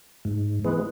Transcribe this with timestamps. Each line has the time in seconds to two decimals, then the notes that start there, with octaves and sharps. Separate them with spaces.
0.25 G#2
0.64 E3 G#3 B3